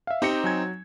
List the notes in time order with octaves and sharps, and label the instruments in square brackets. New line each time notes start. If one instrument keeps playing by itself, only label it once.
[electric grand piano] E5 F5
[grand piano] C4 D#4 [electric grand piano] G4 A#5 C#7
[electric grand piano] F#3 G#5 G#6